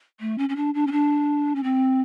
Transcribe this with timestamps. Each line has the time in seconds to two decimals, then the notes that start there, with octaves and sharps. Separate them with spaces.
0.20 A3
0.38 C#4
0.49 C#4
0.56 D4
0.74 D4
0.87 C#4
0.92 D4
1.55 C#4
1.63 C4